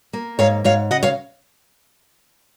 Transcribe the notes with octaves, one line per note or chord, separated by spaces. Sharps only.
A#3
G#2 C#5 F5
G#2 C#5 F5
C#3 D#5 F#5
C#5 F5